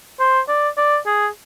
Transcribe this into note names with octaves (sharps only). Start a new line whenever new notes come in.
C5
D5
D5
G#4